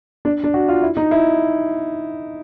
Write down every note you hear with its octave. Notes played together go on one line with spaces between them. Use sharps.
D4
D4
F#4
F4
E4
D#4
E4